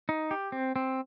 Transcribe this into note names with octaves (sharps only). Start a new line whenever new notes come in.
D#4
G4
C4
C4